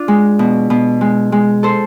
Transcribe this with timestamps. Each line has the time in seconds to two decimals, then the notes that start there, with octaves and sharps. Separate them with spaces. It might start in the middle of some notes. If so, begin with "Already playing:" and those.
Already playing: D4 F4
0.08 G#3
0.39 B2
0.70 B2
1.01 G#3
1.32 G#3
1.63 A4 C5